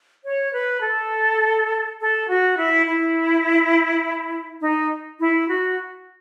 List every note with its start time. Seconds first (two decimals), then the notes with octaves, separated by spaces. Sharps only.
0.24 C#5
0.54 B4
0.83 A4
1.99 A4
2.28 F#4
2.57 E4
2.86 E4
4.60 D#4
5.19 E4
5.48 F#4